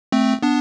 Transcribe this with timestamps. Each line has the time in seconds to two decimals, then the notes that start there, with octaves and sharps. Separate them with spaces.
0.12 A3 C4
0.42 B3 D4